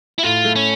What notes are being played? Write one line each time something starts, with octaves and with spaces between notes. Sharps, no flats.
E4
A2 F4
A3
C#4